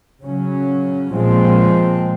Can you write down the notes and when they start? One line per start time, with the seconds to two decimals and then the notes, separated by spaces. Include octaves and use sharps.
0.23 C#3 F#3 C#4
1.13 A#2 F3 G#3 C4